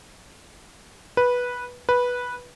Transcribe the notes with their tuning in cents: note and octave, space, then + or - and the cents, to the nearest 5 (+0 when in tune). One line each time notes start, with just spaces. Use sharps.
B4 -10
B4 -10